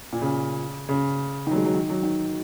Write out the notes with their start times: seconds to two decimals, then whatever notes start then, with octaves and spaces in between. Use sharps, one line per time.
0.12 A#2
0.22 C#3
0.89 C#3
1.47 D#3 F#3
1.56 G#3
1.65 F#3
1.74 D#3
1.90 F#3
2.03 D#3